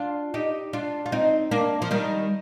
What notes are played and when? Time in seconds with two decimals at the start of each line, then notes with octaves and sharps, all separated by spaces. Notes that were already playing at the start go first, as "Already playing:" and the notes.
Already playing: D4 F4
0.34 D#4 G4
0.73 D4 F4
1.06 F4
1.12 C4 D#4
1.51 A#3 D4
1.82 F3
1.91 D#3 G3